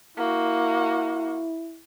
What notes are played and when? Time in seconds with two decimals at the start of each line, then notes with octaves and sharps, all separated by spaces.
0.17 A#3 E4 F#4